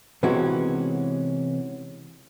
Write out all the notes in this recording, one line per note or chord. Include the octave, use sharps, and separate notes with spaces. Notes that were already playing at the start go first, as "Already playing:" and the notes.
C3 E3 G#3 B3 C#4 F#4